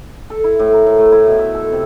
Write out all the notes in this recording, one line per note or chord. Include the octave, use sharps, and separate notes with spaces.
A4
E4
A2
A#4
A2
A3
E4
B2
E5
A4
C3